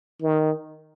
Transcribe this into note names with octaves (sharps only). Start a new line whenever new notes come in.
D#3